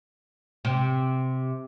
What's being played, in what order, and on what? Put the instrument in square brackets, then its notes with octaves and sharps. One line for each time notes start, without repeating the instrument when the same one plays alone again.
[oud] C3